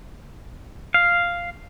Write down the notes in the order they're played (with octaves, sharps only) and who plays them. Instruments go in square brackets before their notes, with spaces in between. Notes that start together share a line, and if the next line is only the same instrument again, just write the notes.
[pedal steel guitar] F5